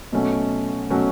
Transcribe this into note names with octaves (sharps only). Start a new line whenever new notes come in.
B2 F#3 A3 C#4
B2 F#3 A3 C#4